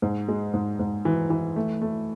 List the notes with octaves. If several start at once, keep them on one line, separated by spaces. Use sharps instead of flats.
G#2
G#3
G#2
G#2
E3
E3
A3
A3